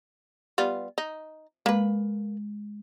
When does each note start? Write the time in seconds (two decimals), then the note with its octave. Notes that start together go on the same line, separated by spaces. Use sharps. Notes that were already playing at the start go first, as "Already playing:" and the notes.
0.58 G3 B3 F4
0.98 D#4
1.66 G#3 A#3 B4